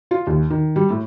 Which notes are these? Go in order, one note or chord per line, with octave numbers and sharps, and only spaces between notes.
F4
D#2
D#3
G3
A2